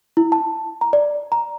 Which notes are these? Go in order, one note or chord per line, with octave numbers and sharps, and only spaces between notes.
E4
A5
A#5
D5
A#5